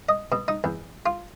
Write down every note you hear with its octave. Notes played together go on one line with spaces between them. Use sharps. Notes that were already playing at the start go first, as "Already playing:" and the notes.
D#5
B2
D#4
E2
F4